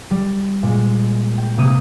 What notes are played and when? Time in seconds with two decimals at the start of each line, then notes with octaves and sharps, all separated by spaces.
0.11 G3
0.63 A#2 G#3
1.38 G5
1.57 C3 A#3 D#6 D#7